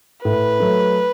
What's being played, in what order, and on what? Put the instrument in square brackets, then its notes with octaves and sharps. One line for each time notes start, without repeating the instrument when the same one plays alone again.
[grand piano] A2 [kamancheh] B4
[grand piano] F#3 A3